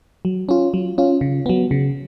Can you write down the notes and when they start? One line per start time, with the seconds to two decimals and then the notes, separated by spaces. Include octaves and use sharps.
0.25 F#3
0.49 C#4 F4
0.74 F#3
0.98 C#4 F4
1.21 C#3
1.46 F#3 B3
1.71 C#3